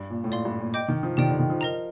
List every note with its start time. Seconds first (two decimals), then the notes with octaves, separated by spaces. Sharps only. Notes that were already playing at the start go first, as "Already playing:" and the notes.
Already playing: G2
0.10 A#2
0.24 A2
0.31 A#2 D5 F5 C6
0.45 G2
0.59 A#2
0.74 D#5 G5 D6 G6
0.88 D#3
1.03 F3
1.17 D#3 G4 D5 G5
1.29 D3
1.39 D#3
1.50 F3
1.61 A#4 D#5 A#5